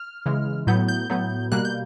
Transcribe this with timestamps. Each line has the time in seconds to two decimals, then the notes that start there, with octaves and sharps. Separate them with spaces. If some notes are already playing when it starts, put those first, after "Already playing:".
Already playing: F6
0.26 C#3 E3 G#3
0.67 A2 F#3 B3 G6
0.88 G6
1.10 A2 F#3 B3
1.52 B2 G3 A#3 F#6
1.65 G6